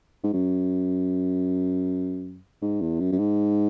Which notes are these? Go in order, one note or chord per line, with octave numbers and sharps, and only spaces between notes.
G#2
F#2
G#2
E2
F#2
F#2
G#2